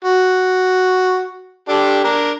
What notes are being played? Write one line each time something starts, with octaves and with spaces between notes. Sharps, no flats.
F#4
D4 G4 A4
D4 A#4